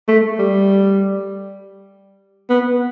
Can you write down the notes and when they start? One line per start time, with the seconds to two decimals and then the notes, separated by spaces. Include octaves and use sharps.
0.08 A3
0.39 G3
2.50 B3